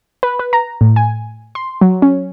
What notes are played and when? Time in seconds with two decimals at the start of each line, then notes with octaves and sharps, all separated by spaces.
0.23 B4
0.39 B4
0.53 A#5
0.81 A2
0.96 G#5
1.55 C6
1.81 F#3
2.02 C#4